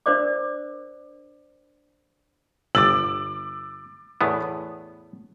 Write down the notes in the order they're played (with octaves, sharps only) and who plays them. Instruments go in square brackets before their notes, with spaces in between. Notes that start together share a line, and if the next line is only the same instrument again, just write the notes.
[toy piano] D4 A#4 C5 D5 D6
[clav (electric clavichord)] G1 [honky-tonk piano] D6 F#7 [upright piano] E6 A6
[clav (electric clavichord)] E2 A2 B3